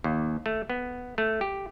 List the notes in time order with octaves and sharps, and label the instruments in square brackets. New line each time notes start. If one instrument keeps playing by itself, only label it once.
[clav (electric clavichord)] D#2
A3
B3
A3
G4